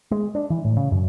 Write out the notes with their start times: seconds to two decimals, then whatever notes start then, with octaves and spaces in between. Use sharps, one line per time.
0.11 G#3
0.35 D4
0.50 E3
0.65 A2
0.77 C#3
0.92 F#2